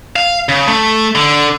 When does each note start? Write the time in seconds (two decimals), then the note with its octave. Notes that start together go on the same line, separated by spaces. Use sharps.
0.16 F5
0.49 C#3
0.67 A3
1.15 D3